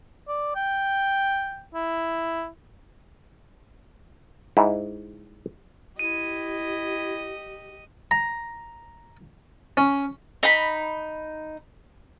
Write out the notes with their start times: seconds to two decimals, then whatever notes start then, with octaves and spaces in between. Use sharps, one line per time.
0.28 D5
0.55 G5
1.74 E4
4.57 G#2 E4
5.99 E4 G4 D#5 D#7
8.11 A#5
9.77 C#4
10.43 D#4 B5